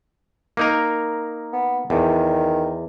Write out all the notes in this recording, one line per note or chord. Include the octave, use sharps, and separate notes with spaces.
A#3 D#4 A#4
B3
E2 D#3